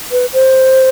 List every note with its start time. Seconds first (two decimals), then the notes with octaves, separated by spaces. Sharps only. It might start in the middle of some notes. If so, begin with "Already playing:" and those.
0.12 B4
0.33 C5